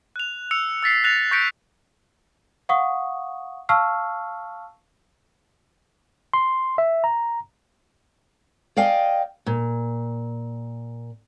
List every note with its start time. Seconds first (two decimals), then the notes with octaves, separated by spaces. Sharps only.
0.16 F#6 F7
0.51 E6 C#7 F7
0.83 E6 A6 B6 C7
1.04 F#6 A6 A#6 F7
1.31 C#6 G6 A#6 B6 C#7 D7
2.69 F5 F#5 C#6 D#6
3.69 F5 A5 C#6 E6 F6 C7
6.34 C6
6.78 E5
7.04 A#5
8.77 D5 D#5 F5 G5 G#5
9.46 A#2